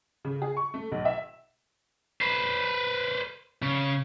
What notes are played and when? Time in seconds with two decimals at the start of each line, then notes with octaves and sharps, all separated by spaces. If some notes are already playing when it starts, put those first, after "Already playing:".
0.25 C#3
0.42 G#4
0.57 C#6
0.74 A3
0.92 B1
1.05 E5
2.21 B4 C5
3.62 C#3